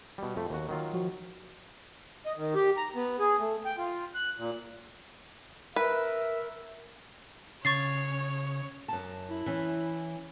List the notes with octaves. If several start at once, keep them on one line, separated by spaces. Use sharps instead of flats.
B2 G3
F2 A3
D#2 F#4
D#3 F#3 F4
F3 F#4
D#5
D#3
G4
A#5
B3
G#4
A3
G5
F4
F#6
A#2
A#4 B4 E5
C#3 C#5 C#6 A6 C7
F#2 A5
E4
E3 C#4